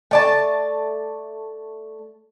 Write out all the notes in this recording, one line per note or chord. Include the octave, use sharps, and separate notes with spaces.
A3 D5 A5